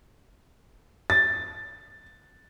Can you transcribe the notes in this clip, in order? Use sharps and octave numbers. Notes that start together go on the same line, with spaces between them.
A6